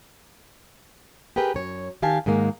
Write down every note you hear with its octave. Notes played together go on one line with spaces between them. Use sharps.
G4 G#4 A#4 B4 G5
F#2 C#5
D#3 G4 F5 G#5 A5
G#2 D#3 G#3 A#3